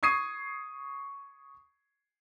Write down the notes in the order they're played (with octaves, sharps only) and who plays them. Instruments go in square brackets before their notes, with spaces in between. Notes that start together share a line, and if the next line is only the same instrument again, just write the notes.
[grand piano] C#6 D#6 G#6 C7 D#7